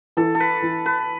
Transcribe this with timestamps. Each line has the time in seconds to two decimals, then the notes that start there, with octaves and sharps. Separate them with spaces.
0.17 E3 A4
0.35 A4
0.40 B4
0.62 E3
0.86 B4